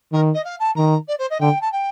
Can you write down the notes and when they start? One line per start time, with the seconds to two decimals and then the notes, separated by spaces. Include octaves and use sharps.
0.12 D#3 A#4
0.34 D#5
0.45 F5
0.60 A5
0.76 D#3 A#5
1.08 D5
1.19 C5
1.30 D#5
1.40 D3 G5
1.61 A5
1.72 G5